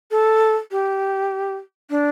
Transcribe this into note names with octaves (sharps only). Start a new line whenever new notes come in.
A4
G4
D4